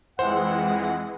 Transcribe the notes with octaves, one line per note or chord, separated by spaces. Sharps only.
F2 E3 G#3 C4 C5 F#5